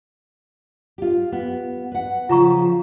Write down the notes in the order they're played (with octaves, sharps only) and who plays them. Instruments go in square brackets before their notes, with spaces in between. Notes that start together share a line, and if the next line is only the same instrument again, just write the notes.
[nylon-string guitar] F4 G4
B3
B4 F#5
[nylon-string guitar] C#3 F3 [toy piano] F4 A#5 C#6